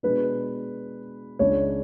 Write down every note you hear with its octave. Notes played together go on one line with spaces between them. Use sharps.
B2 G#3 D4 B4
C#2 C#3 G#3 D4 C#5